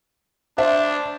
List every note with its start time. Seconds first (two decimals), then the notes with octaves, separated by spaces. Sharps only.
0.58 D4 C5 E5